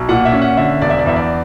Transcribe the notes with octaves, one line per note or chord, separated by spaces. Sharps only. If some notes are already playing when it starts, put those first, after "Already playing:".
Already playing: B1
A#2 F#5
E5
C#4
F#5
D3 E5
E1 D5
E5
D5
E2 E5
D5